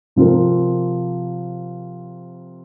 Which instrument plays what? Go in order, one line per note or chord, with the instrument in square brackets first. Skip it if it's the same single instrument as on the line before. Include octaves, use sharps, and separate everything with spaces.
[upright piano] C3 F3 C4 F4 A#4